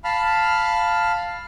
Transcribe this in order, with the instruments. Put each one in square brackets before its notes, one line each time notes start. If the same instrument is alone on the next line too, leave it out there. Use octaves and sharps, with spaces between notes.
[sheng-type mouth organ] F5 A5 B5 F6